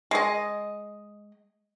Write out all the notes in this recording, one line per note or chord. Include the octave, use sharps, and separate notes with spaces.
G#3 D#5